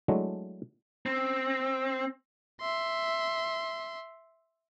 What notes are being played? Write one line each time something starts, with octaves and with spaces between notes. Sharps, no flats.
F#3 G#3 A3 D4 E4
C4
E5 C6